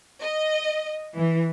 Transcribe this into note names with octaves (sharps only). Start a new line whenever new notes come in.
D#5
E3